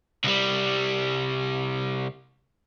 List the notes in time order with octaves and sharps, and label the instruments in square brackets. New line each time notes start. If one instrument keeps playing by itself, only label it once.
[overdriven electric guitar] C2 G3